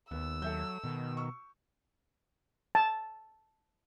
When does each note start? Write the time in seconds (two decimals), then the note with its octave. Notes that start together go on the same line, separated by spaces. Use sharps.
0.11 D#2 B3 E6
0.42 F#3 A4 E5 G6
0.84 B2 D#3
1.17 C#6 E6
2.75 A5